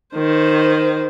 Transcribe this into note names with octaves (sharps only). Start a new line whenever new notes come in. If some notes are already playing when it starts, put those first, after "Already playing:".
D#3 C5